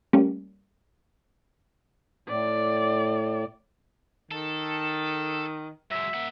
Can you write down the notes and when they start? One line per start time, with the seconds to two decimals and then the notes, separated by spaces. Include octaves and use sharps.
0.13 G3 A3 A#3 C#4
2.28 A2 D5
4.31 D#3 A4
5.91 F#3 G#3 E5
6.14 A#3 F#5